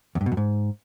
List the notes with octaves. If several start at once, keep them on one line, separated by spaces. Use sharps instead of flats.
E2
G2
B2
F#2
G#2